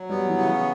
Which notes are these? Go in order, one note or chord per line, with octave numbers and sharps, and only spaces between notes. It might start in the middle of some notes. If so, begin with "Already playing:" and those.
Already playing: F#3
G3 B3
E3
C#3